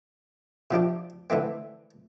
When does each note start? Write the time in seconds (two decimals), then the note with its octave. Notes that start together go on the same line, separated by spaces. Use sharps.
0.71 C3 F3 D4 G4
1.30 D3 E3 A3 C4